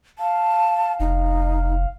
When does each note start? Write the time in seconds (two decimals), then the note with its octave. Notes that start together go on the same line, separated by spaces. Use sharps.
0.19 F5 A5
1.00 F1 D#4